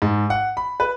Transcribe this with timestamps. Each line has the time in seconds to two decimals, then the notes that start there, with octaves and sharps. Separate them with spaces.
0.02 G#2
0.30 F#5
0.57 B5
0.80 B4